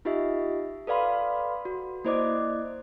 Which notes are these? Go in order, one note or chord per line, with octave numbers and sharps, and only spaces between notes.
D#4 F4 G4 D#5 E5
A4 B4 D5 F5 B5 C6
F#4
A#3 E4 C5 D5 D#5 D6